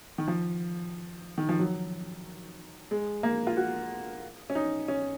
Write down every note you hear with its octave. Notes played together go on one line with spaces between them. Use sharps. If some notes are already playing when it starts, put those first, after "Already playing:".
D#3
F3
D#3
F3
F#3
G#3
A#3
F4
F#4
C#4
D#4
C#4